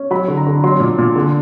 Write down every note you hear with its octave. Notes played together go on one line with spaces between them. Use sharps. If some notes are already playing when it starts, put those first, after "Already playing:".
Already playing: C#4
F#3 B5
D3
A#5
D3
F#3 C6
A#2
A#2
D3